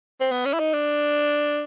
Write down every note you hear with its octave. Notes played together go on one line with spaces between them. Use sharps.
C4
B3
C#4
E4
D#4
D4